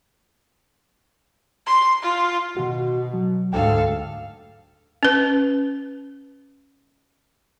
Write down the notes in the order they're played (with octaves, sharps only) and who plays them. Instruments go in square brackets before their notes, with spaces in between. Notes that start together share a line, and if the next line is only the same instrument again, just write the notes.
[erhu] C6
F4
[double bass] B2 [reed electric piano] D#3 F#4
[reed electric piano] F#3
[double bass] D2 G#2 [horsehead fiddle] A4 F5 [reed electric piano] G5
[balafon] C#4 B4